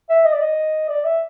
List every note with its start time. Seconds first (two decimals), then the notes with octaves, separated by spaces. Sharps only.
0.09 E5
0.25 D#5
0.33 D5
0.41 D#5
0.89 D5
1.04 E5